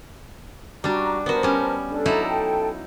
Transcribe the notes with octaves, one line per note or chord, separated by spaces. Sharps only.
G3 D4 F#4 A#5
B3 F#4 A#4 C5 A5
G3 C#4
D4 A4
F#3 D#4 E4
A4 G5 A5